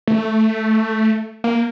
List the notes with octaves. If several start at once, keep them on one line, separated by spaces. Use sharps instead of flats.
A3
A#3